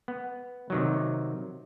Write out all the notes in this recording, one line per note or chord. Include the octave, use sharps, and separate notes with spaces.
B3
C3 D#3 F#3